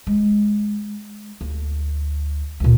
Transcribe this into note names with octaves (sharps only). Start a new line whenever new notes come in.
G#3
D2
D2 A#2